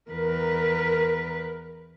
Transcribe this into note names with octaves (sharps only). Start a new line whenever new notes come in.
E2 A#4 B4